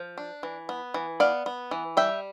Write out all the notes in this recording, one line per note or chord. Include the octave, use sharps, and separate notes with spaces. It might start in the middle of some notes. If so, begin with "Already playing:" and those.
Already playing: F3
D4
E3
B3
E3
B3 D5 F5
B3
E3
G3 E5 G5